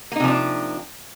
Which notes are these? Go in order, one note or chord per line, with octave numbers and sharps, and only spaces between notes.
C3 F3 A#3 D4 D#4